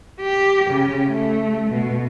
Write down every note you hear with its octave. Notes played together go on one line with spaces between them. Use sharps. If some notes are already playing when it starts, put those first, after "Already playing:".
G4
C#3
A3
B2